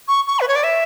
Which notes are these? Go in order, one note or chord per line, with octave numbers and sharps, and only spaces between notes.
C#6
C#6
B4
C#5
D5
E5